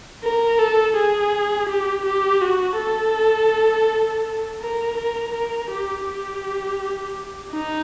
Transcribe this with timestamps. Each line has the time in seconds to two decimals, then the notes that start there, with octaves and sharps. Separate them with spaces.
0.24 A#4
0.59 A4
0.97 G#4
1.69 G4
2.06 G4
2.42 F#4
2.79 A4
4.61 A#4
4.98 A#4
5.33 A#4
5.71 G4
6.07 G4
7.52 D#4